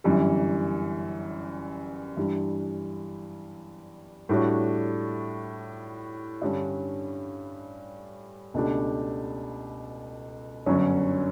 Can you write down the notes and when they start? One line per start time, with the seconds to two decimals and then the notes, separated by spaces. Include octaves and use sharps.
0.04 G1 F#2 E3 G3
2.17 G2 E3 G3
4.29 A2 G3 D4 F#4 C#5
6.41 G2 D3 G3 C#4
8.54 C#2 B2 A3 D4 G4
10.66 G1 F#2 D3 F#3 C#4